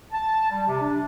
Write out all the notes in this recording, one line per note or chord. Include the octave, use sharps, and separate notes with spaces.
A5
G3
C3
D4